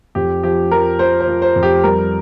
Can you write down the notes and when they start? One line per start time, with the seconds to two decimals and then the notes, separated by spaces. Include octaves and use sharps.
0.15 F2 G4
0.43 F3 G4
0.71 F3 A#4
0.99 F3 C5
1.21 C5
1.28 F3
1.42 C5
1.56 F2
1.63 G4
1.84 G3 A#4